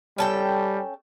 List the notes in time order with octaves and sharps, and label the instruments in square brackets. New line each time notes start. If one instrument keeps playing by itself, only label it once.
[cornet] G3 [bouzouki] C#4 A4 G5